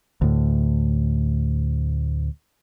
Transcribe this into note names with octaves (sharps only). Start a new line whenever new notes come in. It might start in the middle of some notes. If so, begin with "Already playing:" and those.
D2 A2